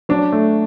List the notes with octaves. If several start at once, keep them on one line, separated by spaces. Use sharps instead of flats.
F#3 D4
A3